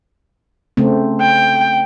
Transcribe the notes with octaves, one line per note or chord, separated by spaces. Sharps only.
C#3 A3 C4
G5